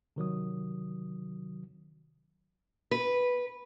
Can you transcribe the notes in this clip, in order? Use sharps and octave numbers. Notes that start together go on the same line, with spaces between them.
C3 D#3 F#3 D#6
B4